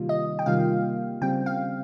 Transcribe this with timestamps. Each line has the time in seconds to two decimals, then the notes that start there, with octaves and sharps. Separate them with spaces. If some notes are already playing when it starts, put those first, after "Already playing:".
Already playing: C3 D#3 G3 A#3 F4
0.09 D#5
0.39 G5
0.46 C3 D#3 G3 A#3 F4 F5
1.22 C#3 G3 C4 G5
1.46 F5